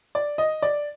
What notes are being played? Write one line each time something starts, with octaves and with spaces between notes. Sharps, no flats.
D5
D#5
D5